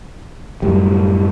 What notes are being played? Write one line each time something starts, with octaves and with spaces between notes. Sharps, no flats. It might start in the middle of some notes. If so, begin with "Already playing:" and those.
F#2 A2 G3